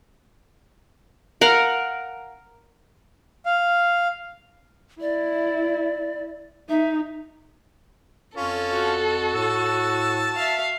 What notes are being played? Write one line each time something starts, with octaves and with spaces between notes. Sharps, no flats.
A#4 F5 F#5 A#5
F5
E4 D5
D#4 E5
F2 C#4 F4 A4
F#4
A2 A5 E6
E5 F5